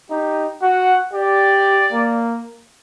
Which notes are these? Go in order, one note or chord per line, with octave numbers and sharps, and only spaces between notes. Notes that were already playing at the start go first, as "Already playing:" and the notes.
D#4 G4
F#4 F#5
G4 D5
A#3